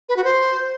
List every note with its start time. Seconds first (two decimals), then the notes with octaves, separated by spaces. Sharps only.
0.09 B4
0.17 F#4
0.24 C5